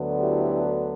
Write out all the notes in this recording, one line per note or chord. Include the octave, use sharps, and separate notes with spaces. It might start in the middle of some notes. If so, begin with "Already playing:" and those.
Already playing: D2 D3 F#3 B3 D4
E4 G4